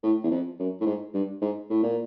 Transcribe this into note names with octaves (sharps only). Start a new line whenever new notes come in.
A2
E2
F2
F#2
A2
G#2
G2
G#2
A2
A#2